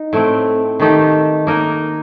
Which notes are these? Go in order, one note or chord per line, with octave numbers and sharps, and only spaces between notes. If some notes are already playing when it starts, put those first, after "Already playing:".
Already playing: D#4
A2 A3 C4
D#3 A3 D#4 G4
A#3 D#4 A#4 D#5